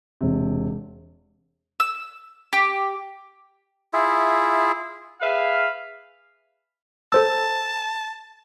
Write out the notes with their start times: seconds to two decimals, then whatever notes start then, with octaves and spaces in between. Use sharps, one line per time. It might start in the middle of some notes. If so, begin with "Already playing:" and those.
0.21 E1 C3
1.80 E6
2.53 G4
3.93 E4 F4 G#4 E5
5.21 G#4 B4 E5 F5
7.12 A4 C5 A5 E6